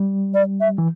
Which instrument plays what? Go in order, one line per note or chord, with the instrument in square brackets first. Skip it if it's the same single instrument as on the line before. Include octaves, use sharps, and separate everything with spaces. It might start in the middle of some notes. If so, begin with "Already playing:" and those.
Already playing: [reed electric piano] G3
[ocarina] D5
E5
[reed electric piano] E3